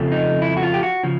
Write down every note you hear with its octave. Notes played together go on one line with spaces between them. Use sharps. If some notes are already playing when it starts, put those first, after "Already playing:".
Already playing: F2 C#3 F3 A3
D#4
E4
F#4
F4
G4
F#4
C#3 F3